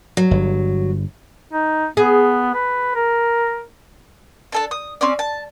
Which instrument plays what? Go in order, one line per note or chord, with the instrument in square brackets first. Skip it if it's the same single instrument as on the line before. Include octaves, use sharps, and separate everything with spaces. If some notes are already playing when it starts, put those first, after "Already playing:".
[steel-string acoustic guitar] F#3
[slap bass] G1 G2
[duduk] D#4
[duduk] B3 [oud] G#4
[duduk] B4
A#4
[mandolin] D4 A4 A5
D#6
C4 C#4 D5
A5